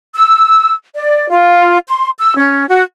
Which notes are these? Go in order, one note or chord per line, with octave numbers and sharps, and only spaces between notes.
E6
D5
F4
C6
E6
C#4
F#4